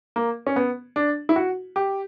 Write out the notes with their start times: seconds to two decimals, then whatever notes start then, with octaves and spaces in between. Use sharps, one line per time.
0.16 A#3
0.47 C#4
0.56 B3
0.96 D4
1.29 E4
1.36 F#4
1.76 G4